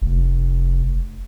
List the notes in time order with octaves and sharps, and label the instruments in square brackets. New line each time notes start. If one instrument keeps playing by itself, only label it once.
[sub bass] F1